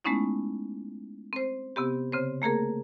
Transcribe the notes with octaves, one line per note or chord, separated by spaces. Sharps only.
G#3 A3 B3 C#4 D#4 E4
C4 C5
C3 B3 C4 G4
C#3 C4 C5
A3 A#3 G#4 A#4